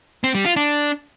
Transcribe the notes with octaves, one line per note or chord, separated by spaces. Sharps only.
C4
G3
F4
D4